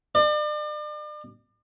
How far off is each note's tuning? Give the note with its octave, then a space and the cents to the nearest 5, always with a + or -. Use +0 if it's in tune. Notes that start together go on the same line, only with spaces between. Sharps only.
D5 +40